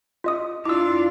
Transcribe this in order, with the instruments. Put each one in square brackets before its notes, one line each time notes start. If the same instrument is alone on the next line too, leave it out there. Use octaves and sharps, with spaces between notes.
[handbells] F4 D#5 D#6
[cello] D4 F4 [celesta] E4 [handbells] D6 E6